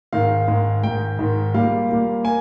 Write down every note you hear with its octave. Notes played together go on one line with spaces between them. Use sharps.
G#2 D#3 G#3 F5
G#2 D#3 G#3
G#2 D#3 G#3 G5
G#2 D#3 G#3
A#2 G3 A#3 F5
A#2 G3 A#3
A#3 G#5